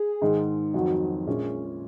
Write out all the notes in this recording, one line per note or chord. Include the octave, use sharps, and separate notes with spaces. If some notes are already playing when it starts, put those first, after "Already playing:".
Already playing: G#4
G#2 D#3 G#3 D#4
F2 D#3 F#3 F#4
A#1 A#2 G#3 C#4 G#4